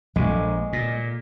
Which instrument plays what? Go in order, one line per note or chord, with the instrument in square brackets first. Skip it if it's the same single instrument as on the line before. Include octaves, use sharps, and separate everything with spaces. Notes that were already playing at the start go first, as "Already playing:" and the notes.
[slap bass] A#1 [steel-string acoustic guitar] G#3
[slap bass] A#2